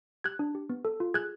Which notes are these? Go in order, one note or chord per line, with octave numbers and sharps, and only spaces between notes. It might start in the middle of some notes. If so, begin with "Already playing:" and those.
G4 F#6 G#6
D4
G4
B3
A4
F4
G#4 F#6 G#6